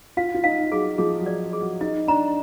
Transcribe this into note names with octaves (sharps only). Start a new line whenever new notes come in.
F4 F5
F4
D#4 F5
F#3 G#4
F3 G#4
F#3
D5
G#4
F#3
D#4 D#5
D4 A#5